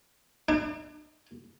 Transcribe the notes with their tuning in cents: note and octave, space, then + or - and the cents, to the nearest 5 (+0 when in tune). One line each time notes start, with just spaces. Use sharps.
D4 +40